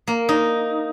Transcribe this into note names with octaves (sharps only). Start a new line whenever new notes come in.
A#3
D#4